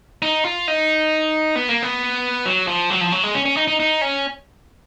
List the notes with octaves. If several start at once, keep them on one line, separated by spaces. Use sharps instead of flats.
D#4
F4
D#4
B3
A#3
B3
F#3
F3
F#3
F3
F#3
G#3
C#4
C#4
D#4
D#4
D#4
C#4